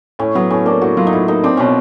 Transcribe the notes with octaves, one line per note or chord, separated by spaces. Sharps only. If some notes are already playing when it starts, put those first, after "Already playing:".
A2 C#4
F#3 B3
A2 C#4
A#3 D4
A2 F#4
F#3 F4
D#4
A2 E4
A#3 D#4
C4 D4
B2 C#4